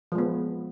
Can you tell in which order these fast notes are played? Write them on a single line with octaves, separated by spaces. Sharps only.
F3 G#3 B3